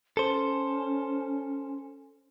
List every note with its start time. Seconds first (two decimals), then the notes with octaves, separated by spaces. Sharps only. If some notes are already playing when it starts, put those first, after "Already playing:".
0.17 C#4 A4 C5